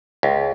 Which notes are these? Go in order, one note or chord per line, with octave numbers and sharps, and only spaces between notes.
C#2